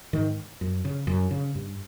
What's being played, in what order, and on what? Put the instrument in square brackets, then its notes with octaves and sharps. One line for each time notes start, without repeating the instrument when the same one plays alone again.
[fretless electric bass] G#2 D#3
F#2
C#3
F#2
C#3
G2